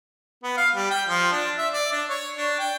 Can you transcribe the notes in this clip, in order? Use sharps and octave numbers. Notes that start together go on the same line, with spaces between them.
B3
F5
G3
G5
F3
D4
E5
D5
D4
C#5
D4
G5